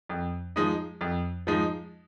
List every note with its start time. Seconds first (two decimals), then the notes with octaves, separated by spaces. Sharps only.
0.09 F2
0.56 F3 G#3 D#4
1.01 F2
1.47 F3 G#3 D#4